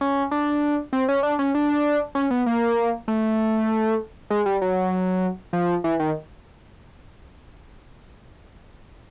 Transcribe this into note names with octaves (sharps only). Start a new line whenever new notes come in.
C#4
D4
C4
C#4
D4
C#4
D4
C#4
B3
A#3
A3
G#3
G3
F#3
F3
E3
D#3